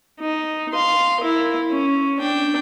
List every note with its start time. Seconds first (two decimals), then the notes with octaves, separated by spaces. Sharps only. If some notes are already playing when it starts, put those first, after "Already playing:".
0.20 D#4
0.73 F5 C6
1.20 E4 A#4
1.71 C#4
2.20 D4 G5